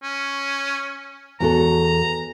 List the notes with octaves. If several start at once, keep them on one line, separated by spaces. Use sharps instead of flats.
C#4
E2 F#4 A4 A#5